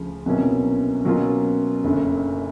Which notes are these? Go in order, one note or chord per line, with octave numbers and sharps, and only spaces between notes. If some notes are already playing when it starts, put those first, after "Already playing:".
Already playing: D2 C#3 F3
C2 B2 F#3 A#3 C#4
B2 F#3 A#3 C#4 F4
F#1 F#2 D3